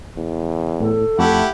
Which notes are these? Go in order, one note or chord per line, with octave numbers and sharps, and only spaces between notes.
E2
A2 A4
F2 A3 E4 G4 F#5